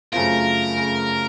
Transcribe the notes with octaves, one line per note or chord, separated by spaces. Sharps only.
F#2 C#3 A3 C4 F4 A#4
C#3 A3